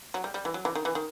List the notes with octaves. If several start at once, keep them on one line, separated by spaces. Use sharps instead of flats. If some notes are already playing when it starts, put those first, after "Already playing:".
F#3
G3
G3
E3
F#3
E3
D#3
E3
D#3